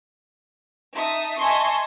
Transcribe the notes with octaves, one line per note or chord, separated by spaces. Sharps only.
D#4 E5 A5 D#6
D#5 E5 G#5 A5 C6 C#6